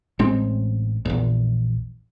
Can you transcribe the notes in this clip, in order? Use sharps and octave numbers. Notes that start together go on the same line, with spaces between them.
A1 G#3 C4
A#1 E2